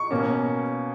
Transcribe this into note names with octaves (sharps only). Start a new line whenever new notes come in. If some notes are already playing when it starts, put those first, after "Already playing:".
Already playing: C#6
B2 A#3 C#4